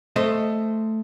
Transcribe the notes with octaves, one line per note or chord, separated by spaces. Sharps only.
A3 C5 D#5